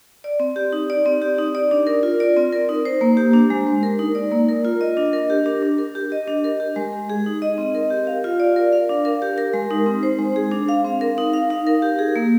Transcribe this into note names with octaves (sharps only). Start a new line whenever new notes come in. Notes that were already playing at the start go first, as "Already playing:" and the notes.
D5
C4
G4
D#4
D5
C4
G4
D#4
D5
D4
A#4
F4
D5
C4
A#4
D#4
C5
A#3
G4
D4
G#3
G#3
A#4
D#4
D5
A#3
A#4
F4
D#5
D4
A#4
G4
D4
D4
A#4
G4
D#5
D4
A#4
G4
G#3
G#3
G#4
D#4
D#5
C4
A#4
G4
F5
F4
D5
A#4
F5
D4
A#4
G4
A#4
G#3
D#4
C4
C5
G#3
G#4
D4
F5
C4
A#4
D#4
F5
D#4
A#4
G4
G#4
A#3